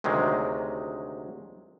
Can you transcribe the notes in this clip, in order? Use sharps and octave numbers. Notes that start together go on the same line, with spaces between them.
D2 C3 D#3 F#3 G#3